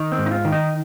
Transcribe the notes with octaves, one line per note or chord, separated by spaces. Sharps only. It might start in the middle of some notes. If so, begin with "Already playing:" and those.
Already playing: D#3
C4
G#2
D#4
F4
D#3
D#4